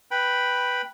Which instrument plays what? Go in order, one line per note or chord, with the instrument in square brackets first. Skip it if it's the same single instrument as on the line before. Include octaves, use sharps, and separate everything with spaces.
[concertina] B4 G5 B5